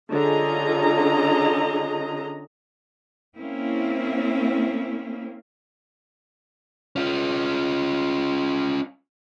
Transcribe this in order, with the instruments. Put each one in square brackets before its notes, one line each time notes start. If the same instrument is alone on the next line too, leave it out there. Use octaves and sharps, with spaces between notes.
[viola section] D3 C#4 F4 G#4 D#5 A#5
[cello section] A#3 C4 C#4 E4
[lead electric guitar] C#4 F4